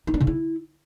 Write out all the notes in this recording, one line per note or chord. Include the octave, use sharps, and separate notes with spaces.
D#4
D4
C#3
E4